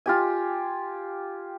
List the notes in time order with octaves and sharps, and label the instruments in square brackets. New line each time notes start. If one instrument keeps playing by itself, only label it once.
[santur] F4 G4 G#5